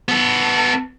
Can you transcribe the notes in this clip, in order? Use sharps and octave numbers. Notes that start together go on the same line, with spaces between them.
B3 A4